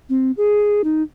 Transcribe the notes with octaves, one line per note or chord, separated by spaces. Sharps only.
C4
G#4
D#4